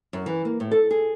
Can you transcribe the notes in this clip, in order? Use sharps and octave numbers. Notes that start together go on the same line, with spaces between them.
F#2
E3
A#3
A2
A4
G#4